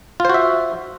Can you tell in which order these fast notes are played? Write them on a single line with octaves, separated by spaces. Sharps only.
F4 C5 F#4 E5